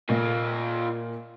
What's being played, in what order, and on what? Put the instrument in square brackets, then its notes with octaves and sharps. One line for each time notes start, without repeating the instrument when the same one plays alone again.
[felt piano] A#2 A#3 [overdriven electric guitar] F4 D#5